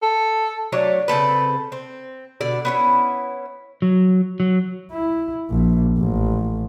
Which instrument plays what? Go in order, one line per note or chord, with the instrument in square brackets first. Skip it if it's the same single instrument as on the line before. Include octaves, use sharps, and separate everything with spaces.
[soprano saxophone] A4
[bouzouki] F#3 A3 D4 C#5
C#3 C4 A4 B4
C4
B2 D3 D5
B3 C#4 E4
[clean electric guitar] F#3
F#3
[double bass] E4
A#1
A1